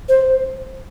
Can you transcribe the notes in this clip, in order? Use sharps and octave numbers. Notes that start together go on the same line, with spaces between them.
C5